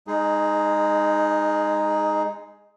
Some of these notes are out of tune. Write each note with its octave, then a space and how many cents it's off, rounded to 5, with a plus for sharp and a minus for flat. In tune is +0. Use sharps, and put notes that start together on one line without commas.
G#3 -25 D#4 +0 G#4 +10